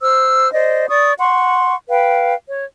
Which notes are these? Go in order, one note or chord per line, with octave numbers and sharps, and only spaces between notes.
C5 E6 F6
C5 D5 D#5
D5 C#6 D#6
F#5 C6 C#6
B4 F5 G5
C#5